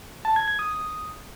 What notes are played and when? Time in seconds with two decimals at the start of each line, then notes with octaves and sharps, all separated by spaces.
0.25 A5
0.36 G#6
0.48 G#6
0.59 D#6